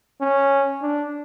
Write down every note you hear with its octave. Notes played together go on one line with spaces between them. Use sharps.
C#4
D4